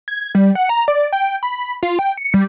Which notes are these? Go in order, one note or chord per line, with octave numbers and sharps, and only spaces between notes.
G#6
G3
F#5
A#5
D5
G5
B5
F4
G5
C#7
G3